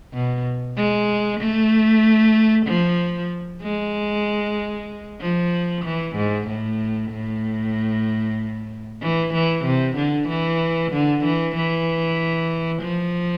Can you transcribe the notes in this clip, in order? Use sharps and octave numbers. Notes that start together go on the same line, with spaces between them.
B2
G#3
A3
F3
G#3
F3
E3
G#2
A2
A2
E3
E3
C3
D3
E3
D3
E3
E3
F3